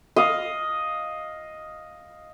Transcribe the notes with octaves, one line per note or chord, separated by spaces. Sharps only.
D#5 F5